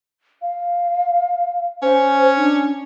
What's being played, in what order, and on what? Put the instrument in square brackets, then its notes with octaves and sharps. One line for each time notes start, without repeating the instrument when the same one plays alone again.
[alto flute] F5
[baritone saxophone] C#4 [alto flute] C5
[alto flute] D4